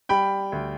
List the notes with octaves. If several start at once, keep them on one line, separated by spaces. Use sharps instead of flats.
G3 G5 B5
D2